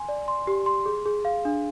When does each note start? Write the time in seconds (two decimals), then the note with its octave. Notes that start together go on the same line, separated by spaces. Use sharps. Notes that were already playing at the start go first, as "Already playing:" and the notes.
Already playing: G#5 C6
0.09 D5
0.28 C6
0.47 G4
0.66 C6
0.86 G#4
1.06 G#4
1.25 F5
1.45 D4